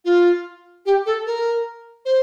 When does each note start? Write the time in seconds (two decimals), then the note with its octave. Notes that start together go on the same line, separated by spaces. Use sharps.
0.05 F4
0.86 G4
1.06 A4
1.26 A#4
2.05 C5